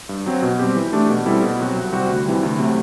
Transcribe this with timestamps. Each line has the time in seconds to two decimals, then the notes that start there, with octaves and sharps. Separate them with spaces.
0.09 G2
0.26 F#3 C4
0.42 B2
0.59 G3 C4 G4
0.76 E3
0.93 A3 D4 G4
1.09 B2
1.26 G3 C4 E4 A4
1.42 B2
1.59 F#3 C4 F#4
1.76 C2
1.93 C3 G3 C4 F#4
2.09 D2
2.26 C3 E3 G3
2.43 D2
2.59 C3 F#3 A3